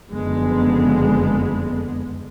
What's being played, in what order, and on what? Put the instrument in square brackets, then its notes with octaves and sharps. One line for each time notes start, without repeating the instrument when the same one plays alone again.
[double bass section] F#1 F2 D3 G#3 B3